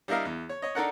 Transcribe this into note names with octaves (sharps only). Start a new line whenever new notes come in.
G3 D4 E4 A#4 D#5 F5
E2
C#5
C#5 D#5
D4 D#4 A4 A#4 F#5